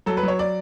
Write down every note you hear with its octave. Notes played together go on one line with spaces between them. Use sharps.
F#3 A4
B4
F#3
C#5
D5